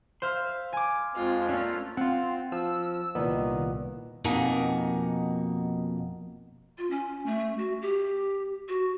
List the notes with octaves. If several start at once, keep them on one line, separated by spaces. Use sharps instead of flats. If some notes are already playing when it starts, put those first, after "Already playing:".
C5 E5 F5 C6
G#5 D6
F2 G#3 C4 F4
A3 A#3 C#4 D4 F4
C4 F4 F#5
F3 E6
C2 A#2 D#3 B3
F2 B2 A#3 D#4 F#5 G#5
F4
C#4
A3
F#4
G4
F#4